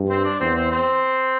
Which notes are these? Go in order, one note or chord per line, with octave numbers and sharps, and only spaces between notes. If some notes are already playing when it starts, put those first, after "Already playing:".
Already playing: G2
C4 C5
D4 D5
E2 C4 C5
C4 C5
C4 C5